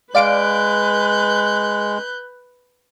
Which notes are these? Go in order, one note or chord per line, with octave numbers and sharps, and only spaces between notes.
G#3 B4 D5 F5 F#6 G6 D7